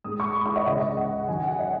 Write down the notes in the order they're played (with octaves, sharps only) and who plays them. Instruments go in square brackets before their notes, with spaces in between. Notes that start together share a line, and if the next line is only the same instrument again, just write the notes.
[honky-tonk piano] G#2 G#3 D#6
C#6
B5
C#6
D#5
C#2 C#3 G#3 D#5
F#5
F#2 D#3 F#3 G#5
F#5
D#5